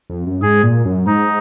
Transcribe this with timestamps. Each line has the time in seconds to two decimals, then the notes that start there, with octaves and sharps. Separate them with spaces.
0.10 F2
0.27 F#2
0.42 G#2 G#4
0.63 A#2
0.85 F#2
1.06 G#2 D#4